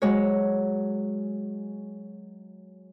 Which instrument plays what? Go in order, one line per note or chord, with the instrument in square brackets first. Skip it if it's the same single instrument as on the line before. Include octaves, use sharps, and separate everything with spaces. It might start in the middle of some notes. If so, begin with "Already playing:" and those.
[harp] F#3 G#3 C#5